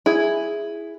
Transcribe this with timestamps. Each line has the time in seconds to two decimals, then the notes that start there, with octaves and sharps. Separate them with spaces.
0.06 E4 G#4